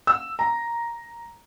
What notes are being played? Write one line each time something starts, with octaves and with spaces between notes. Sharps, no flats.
E6
A#5